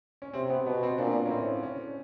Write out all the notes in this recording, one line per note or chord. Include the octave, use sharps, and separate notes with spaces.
C#4
C3 C4
B3
B2 B3
C4
A#2 D4
C#4
A2 C4
C#4